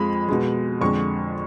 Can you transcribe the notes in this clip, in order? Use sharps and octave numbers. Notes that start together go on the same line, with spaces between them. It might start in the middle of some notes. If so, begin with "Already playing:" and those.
Already playing: F2 F3 G#3 B5
B2 G#3
F2 D3 G#3 C#6